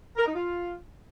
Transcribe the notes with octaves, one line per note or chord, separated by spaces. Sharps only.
A#4
D#4
F4